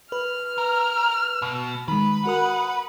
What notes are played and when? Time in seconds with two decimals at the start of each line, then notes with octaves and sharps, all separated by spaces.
0.12 B4 F6
0.58 A#4
1.42 B2
1.88 D#3 G#3 B4
2.26 F#4 A#4 F#5 D#6